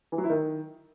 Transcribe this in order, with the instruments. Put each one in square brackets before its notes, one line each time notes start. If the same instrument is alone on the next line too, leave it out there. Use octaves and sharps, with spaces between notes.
[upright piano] E3
F#3
E4
D#3